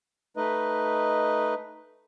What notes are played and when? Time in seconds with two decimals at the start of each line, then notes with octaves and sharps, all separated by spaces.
0.37 A3 D#4 B4 D#5